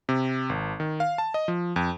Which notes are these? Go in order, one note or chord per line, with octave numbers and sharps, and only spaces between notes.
C3
G#1
D#3
F5
A5
D#5
F3
F2